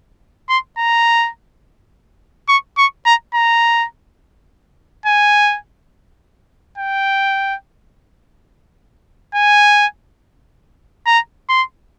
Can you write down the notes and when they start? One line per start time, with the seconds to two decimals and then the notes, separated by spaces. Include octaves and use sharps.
0.49 C6
0.78 A#5
2.48 C#6
2.77 C#6
3.06 A#5
3.34 A#5
5.06 G#5
6.78 G5
9.35 G#5
11.06 A#5
11.49 C6